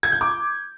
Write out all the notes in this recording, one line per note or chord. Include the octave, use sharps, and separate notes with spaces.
G#6
G6
D6